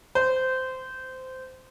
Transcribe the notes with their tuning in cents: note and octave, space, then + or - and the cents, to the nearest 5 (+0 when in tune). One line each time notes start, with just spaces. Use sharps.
C5 -15